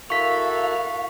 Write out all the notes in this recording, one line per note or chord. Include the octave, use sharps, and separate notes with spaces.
E4 F#4 A4 A#4 F5 C#6 B6